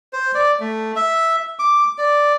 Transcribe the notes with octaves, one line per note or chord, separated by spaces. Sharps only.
C5
D5
A3
E5
D6
D5